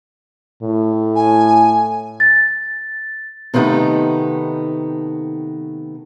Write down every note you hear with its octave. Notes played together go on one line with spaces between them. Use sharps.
A2
G#5
A6
C3 D#3 A3 B3 D#4